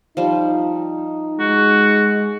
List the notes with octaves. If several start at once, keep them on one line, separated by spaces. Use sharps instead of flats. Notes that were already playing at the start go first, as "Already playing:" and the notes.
F3 G3 D#4
G#3 F#4